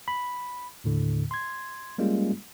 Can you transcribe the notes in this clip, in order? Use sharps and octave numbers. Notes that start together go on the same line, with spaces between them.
B5
D#2 A2 D3
C6 G#6
G3 G#3 A#3 C#4 F4